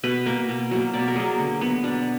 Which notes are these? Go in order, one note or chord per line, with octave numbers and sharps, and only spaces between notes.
B2 B4
A#3
B2
F#3 A#3
B2 D5
A#4
F#3 A#3 G#4
D3
F#3 B3
B2 D4